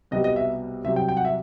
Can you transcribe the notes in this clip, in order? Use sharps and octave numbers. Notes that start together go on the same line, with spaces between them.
C2 B2 G3 D#5
D#5
E5
C2 C3 F#3 E5
G5
G5
F#5
E5